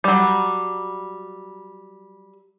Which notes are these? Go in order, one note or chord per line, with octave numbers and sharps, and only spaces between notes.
F#3 G3